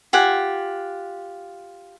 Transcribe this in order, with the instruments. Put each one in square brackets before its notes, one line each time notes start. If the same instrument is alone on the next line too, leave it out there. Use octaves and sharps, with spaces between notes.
[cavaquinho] F4 G4 F#5 G#5